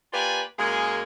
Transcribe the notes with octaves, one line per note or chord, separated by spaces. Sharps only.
A#3 F4 G4 B4 D5 G#5
F#2 G#3 A#3 G#4